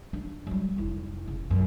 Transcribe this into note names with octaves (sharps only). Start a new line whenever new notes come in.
D4
F#3 G3
F1 E4
C#3
B1 F#2